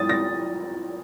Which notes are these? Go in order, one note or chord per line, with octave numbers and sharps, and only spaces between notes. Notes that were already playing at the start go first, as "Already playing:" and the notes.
Already playing: D#6 A6
A#6